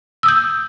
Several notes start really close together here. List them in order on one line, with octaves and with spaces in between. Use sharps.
E6 D#6 G6